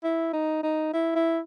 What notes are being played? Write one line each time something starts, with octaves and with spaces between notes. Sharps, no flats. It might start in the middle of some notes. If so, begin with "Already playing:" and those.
E4
D#4
D#4
E4
E4